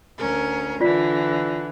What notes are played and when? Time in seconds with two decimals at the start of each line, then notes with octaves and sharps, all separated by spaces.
0.17 D2 C#4 A#4
0.81 D3 E3 F4 D5 B6